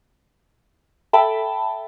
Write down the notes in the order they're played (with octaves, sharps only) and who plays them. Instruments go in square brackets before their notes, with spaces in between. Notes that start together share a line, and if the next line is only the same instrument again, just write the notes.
[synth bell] A4 E5 G5 A5 B5